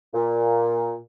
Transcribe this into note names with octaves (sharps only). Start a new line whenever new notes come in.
A#2